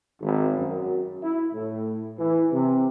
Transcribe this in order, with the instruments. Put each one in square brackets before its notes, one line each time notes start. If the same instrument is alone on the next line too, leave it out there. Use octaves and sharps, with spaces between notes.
[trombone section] G#1
F#2
E4
A2
E3
C3